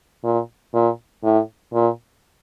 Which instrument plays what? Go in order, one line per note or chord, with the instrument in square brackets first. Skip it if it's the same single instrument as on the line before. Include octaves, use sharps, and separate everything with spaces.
[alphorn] A#2
A#2
A2
A#2